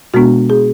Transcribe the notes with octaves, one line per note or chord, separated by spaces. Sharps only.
B2 G#3 B3 D4 F#4
G#4